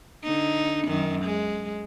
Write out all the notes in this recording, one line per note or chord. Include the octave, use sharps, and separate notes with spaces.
D3 D#4
F#2 D#3
G#3